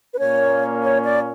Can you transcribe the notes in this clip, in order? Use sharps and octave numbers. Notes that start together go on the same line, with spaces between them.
B4
A#2 A#3 C#4 C#5
C#5
D5